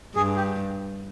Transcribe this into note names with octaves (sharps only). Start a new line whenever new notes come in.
G2 G#4
G4